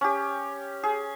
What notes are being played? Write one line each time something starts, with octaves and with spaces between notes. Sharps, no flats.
C#4 G4
G#4